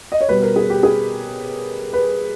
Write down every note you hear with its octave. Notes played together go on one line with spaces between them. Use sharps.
D#5
C#5
B2 G3 B4
A#4
G#4
G4
G#4
B4